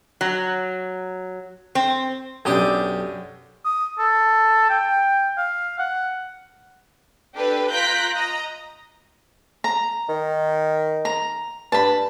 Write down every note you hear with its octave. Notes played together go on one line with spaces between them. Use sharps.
F#3
C4
B1 F#2 D4 G4 D#6
D#6
A4
G5
F5
F#5
D4 G4 A4 B4
F4 A#5 F#6 G6 B6 D7
D#5 A#5
A#5
D#3
A#5
G2 A5 B5